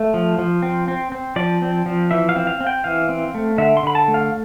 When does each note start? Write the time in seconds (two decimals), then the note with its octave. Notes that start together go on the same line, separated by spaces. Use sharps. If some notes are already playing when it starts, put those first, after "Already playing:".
Already playing: A3
0.14 F3
0.39 F3
0.62 C4
0.88 C4
1.12 C4
1.36 F3 D5
1.62 C4
1.86 F3
2.11 E3 E5
2.29 F5
2.36 C4
2.47 F5
2.61 C4
2.67 G5
2.84 E3 F5
3.09 C4
3.35 A3
3.58 D3 E5
3.77 C6
3.83 D3 B5
3.95 A5
4.08 A3
4.14 F5